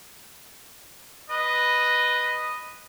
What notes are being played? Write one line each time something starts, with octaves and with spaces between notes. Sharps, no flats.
B4 D#5